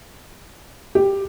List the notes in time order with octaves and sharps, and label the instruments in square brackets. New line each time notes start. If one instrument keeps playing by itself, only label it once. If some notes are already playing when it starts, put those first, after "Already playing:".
[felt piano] G4